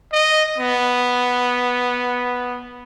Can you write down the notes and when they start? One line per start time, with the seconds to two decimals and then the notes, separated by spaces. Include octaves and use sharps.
0.13 D#5
0.58 B3